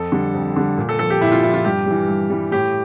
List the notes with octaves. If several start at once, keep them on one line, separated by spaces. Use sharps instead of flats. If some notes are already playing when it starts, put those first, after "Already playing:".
Already playing: F2 A4
D3 G3
F2
D3 G3
A#2
A4
F3 A4
G4
A#2 E4
F4
F3 E4
F4
G2 G4
E3 G3
G2
E3 G3
A2 G4